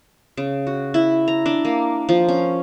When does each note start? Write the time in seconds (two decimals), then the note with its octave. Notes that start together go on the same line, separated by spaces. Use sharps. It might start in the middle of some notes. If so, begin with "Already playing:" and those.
0.37 C#3
0.67 F#4
0.94 E4
1.28 A#5
1.46 D4
1.65 A#3
2.09 F3
2.28 C#4